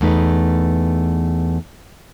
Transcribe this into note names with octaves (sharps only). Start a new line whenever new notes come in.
E2 A3 D#4 B4